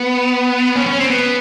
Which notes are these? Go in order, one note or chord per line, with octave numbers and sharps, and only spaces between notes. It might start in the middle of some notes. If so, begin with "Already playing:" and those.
Already playing: B3
C#4
C#4
C4
B3